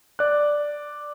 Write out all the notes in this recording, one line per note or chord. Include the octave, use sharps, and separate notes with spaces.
D5 F#6